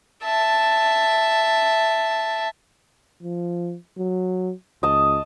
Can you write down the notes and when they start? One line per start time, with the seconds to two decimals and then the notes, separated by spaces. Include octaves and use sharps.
0.24 E5 A5
3.23 F3
3.98 F#3
4.83 C#2 D#5 A5